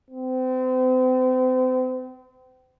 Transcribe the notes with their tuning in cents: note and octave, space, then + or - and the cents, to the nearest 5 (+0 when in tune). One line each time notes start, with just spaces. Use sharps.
C4 -35